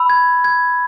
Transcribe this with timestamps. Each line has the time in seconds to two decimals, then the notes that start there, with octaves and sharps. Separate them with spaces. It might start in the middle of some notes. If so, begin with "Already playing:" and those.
Already playing: B5 E6
0.10 G#6
0.44 G#6